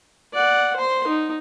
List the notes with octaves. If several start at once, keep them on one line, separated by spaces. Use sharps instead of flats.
D5 F#5
C5 C6
D#4